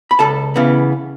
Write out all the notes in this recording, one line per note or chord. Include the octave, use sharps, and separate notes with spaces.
B5
C#2 A4 A5
C#3 E3 B3